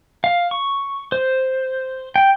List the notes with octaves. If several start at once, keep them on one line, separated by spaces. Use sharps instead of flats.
F5
C#6
C5
G5